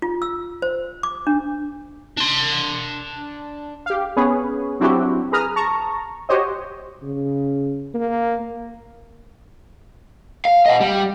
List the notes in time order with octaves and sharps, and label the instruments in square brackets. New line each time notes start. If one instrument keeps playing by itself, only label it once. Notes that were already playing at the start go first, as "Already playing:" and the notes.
[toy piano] F4
E6
C5
D6
D4
[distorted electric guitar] D4 C6
[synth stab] G4 F5
B3 C#4 G#4 B4 C#5
F#3 C4 D4 E4 F#4 G4
G#4 A#4 B4 A#5 D#6 F6
A5 A#5 C#6
F#4 G4 C5 C#5 D#5
[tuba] C#3
A#3
[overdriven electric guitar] F5
D#5 F#5
G3